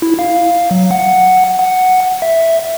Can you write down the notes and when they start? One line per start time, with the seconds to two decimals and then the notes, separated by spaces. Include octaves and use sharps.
0.02 E4
0.19 F5
0.71 F#3
0.91 F#5
1.59 F#5
2.22 E5